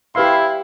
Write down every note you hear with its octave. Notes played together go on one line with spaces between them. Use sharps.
E4 G4 B4 F5 C6